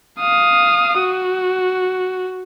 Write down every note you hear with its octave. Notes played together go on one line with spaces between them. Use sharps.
F5 D#6
F#4